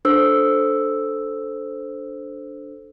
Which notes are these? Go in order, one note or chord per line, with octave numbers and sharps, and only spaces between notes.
D4 A4 C5 E6